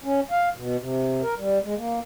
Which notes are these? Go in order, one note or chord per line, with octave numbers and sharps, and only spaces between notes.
C#4
F5
B2
C3
A#4
G3
G#3
A#3